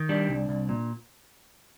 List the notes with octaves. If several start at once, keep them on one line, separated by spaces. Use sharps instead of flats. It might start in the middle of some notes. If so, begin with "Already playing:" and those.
Already playing: D#3
G3 D4
C2
C2
A#2